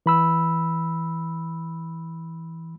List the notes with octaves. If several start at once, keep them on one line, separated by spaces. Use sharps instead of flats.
E3 B5 E6